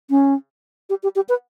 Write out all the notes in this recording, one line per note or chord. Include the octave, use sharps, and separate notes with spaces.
C#4
G4
G4
G4
B4